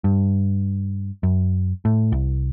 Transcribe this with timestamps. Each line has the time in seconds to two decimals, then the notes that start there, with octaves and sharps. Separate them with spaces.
0.04 G2
1.23 F#2
1.85 A2
2.12 C2